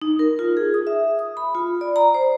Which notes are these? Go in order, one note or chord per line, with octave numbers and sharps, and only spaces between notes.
D#4
A#4
F4
G#4
D#6
E5
D#6
B5
F4
D5
A#5
C5